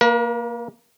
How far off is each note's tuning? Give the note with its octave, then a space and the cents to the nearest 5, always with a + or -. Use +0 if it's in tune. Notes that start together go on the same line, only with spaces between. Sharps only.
A#3 -5 A#4 +45